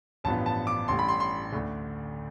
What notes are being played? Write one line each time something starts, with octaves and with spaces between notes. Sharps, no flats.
A1 G2 F3 B3 A5
A5
D6
A1 A2 G3 C6
B5
C6
C6
D2 D3 A3